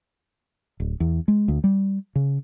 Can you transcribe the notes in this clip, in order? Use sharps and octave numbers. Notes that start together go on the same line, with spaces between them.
D1
E2
G#3
D2
G3
C#3